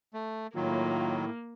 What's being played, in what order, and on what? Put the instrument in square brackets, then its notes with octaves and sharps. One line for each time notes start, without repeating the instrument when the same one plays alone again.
[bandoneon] A3
[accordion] A2 [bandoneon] D#3 F#3 [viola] A#3 [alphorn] F4